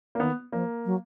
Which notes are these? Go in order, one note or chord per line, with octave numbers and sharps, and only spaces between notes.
A#3
D#3 B3
F3 A#3
F#3